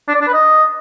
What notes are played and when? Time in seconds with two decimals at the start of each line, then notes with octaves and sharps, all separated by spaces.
0.08 D4
0.15 D5
0.21 D4
0.27 B4
0.34 D#5